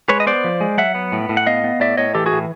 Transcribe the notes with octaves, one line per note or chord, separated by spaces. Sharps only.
G#3 B4 C#5
D#5
B3 C5 D5
F3
G#3
F#3 E5 F#5
B3
A2
A2
F#5
B3 D#5 F5
B3
A2 D5 E5
A2 C#5 D#5
E3 G4 A4
F#4 G#4
A2